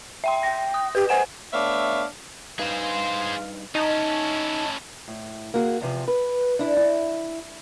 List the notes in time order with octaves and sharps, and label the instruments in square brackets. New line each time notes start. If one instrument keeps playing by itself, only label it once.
[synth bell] E5 G5 C6
[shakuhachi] G5 [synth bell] A#6
[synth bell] D#6
[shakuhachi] G4 [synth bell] B4
[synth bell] C5 F#5 E7 [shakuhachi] G#5
[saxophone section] A3 B3 D4 C#5 E5 F5
[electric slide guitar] G2 D#4 B4 [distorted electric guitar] G#4 C5 [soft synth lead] F5
[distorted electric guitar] C#4 E4 [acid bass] D#4 [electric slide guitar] D#5 [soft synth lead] A5
[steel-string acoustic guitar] A2
A#3 F#4 G#4
E2 C3 F3
B4
D4 E4
E4